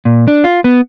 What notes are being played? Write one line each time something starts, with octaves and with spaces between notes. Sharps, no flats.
A#2
D4
F4
B3